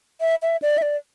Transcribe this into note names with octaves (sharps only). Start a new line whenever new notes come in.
E5
E5
D5
E5
D5